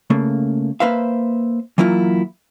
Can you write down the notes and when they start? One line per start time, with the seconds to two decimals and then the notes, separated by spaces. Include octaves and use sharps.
0.10 C#3 A3 A#3
0.80 A#3 B4 C5 E5 F5
1.78 E3 F#3 A#3 E4 F4